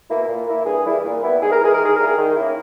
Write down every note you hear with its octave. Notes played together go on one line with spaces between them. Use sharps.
B2 A#3 E4
A#2
A#3 E4
G2 G#4
E3 G3 A#3 E4
A#2
G3 B3 E4
G#2 G#4
A#4
E3 G#3 G#4
D#3 A#4
G#4
G3 A#3 E4 A#4
G#4
D#3
A#3 C#4 E4